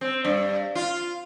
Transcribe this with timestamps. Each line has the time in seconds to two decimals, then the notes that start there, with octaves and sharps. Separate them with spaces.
0.01 C4
0.25 G2
0.75 F4